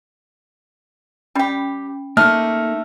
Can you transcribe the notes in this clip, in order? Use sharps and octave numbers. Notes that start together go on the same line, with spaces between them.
G3 C#4 G4 G5 B5
A3 A#3 D#4 A4 F6